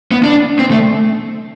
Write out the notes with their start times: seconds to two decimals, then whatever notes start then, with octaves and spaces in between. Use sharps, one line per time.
0.11 B3
0.23 D4
0.59 C4
0.71 A3